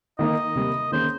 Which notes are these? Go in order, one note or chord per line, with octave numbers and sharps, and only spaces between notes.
D#3 A#3 D#4 D#5
C3 G3 A#3
D#3 A#3 C#4 G#4 C5